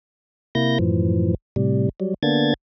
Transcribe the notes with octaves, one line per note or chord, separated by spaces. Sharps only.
C3 A#3 E4 G6 A#6
F#2 A2 E3 F3
A2 C3 G3
F#3 G3
D3 A#3 B3 D4 G#6 A6